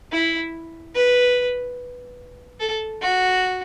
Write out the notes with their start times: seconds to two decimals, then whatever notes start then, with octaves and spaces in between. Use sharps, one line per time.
0.12 E4
0.95 B4
2.60 A4
3.01 F#4